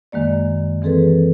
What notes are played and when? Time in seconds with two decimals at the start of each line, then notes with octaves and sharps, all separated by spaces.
0.12 F#2 D#3 G#3 A#3 D5
0.82 E3 C4 G#4 A4 B4